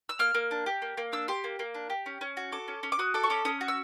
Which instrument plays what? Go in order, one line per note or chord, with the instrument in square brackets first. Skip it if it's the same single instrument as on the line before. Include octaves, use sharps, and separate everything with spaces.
[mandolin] E6
A#3 F6
A#3
D4
G4
A#3
A#3
D4 E6
G4 C6
A#3
A#3
D4
G4
C#4
C#4
F#4
A4 D6
C#4
C#4
D6
F#4 D#6
A4 D6
C#6
C#4 D6
C#4 D#6
F#4
E6